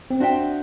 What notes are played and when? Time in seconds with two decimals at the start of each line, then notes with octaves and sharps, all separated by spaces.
0.11 C4
0.20 D4 F#4 C5 E5 G5